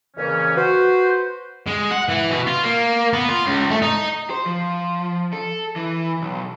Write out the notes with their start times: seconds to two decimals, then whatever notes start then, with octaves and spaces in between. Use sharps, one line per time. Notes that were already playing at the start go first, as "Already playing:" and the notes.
0.17 F2 A#2 C#3 E3 C#4
0.56 F#4 B4 C5
1.68 G#3
1.92 F#5
2.10 E3
2.31 B2
2.47 F4
2.64 A#3
3.13 B3
3.29 F4
3.47 C#2
3.70 A3
3.82 D#4
4.30 C5
4.46 F3
5.33 A4
5.76 E3
6.22 B1